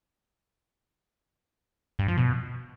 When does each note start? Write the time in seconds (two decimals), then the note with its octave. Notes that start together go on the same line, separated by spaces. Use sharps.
1.99 G2
2.08 F3
2.17 B2